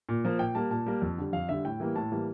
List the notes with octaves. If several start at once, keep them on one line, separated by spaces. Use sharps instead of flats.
A#2
F3 A#3
A#2 G5
G3 A#3 A5
A#2 A5
G3 A#3
F2
D3 G3
F2 F5
D3 G3 E5
A2 G5
E3 G3 A#3
A2 A5
E3 G3 A#3